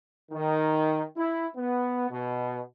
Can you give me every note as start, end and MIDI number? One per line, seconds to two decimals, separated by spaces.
0.31 1.02 51
1.17 1.46 64
1.56 2.08 59
2.10 2.59 47